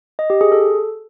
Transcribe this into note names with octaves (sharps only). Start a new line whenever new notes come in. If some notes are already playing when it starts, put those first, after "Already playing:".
D#5
G4
G#4
A4